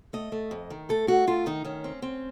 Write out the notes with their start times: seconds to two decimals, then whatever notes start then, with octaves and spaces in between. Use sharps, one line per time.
0.13 A3 D#5
0.32 A3
0.51 F2
0.70 D#3
0.89 A3 A4
1.07 A3 F#4
1.27 A3 F4
1.46 D#3 D#4
1.65 D#3 C#4
1.84 C4
2.02 C4